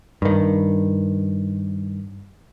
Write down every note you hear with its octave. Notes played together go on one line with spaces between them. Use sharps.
G2 D#3